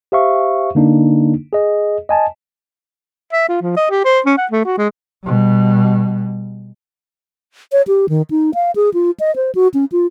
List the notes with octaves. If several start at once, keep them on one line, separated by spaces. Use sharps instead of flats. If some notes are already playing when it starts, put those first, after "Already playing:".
G4 C5 E5 F5 C#6
D3 A#3 D4 D#4
G#4 D#5
D#5 G#5 A5
E5
F4
F3
D#5
G4
C5
C#4
F#5
A3
F#4
G#3
B2 G3
C#5
G4
D#3
D#4
F5
G#4
F4
D#5
C5
F#4
C#4
F4